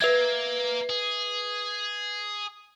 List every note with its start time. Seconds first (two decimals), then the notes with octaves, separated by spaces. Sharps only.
0.01 A#3 B4 E5 G#6
0.90 G#4